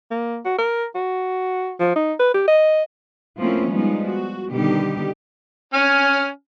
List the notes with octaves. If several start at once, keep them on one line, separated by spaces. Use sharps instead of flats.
A#3
F#4
A#4
F#4
F3
D#4
B4
G4
D#5
F3 A3 A#3 C4 C#4 E4
F3 G3 G#3 B3 D#4
F#4
B2 D3 D#3 G3 D#4 G4
C#4 G#5 F6